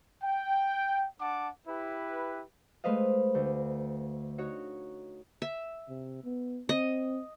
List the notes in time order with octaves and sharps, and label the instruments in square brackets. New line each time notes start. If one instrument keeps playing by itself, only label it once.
[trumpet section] G5
D4 F#5 A5 D6
E4 G4 B4
[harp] G#3 A3 B4 C5 D#5 F5
D2 G6
D#4 F#4 C#5
[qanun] E5
[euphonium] C3
B3
[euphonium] C4 [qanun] D#5